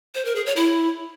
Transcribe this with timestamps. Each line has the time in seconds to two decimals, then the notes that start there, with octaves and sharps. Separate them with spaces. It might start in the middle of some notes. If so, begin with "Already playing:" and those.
0.15 C5
0.25 A#4
0.35 G#4
0.46 C#5
0.56 E4